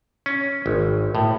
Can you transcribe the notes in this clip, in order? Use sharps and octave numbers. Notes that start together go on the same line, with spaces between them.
C#4
G#1
A2